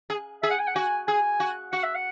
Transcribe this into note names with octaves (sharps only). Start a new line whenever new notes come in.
G#4
G#4 E5
F#5
G#5
F#5
F#4 G#5
G#4 G#5
F#4
F#4 F#5
E5
F#5